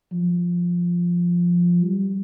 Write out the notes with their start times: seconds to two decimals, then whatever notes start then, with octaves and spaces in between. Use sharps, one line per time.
0.13 F3
1.83 G3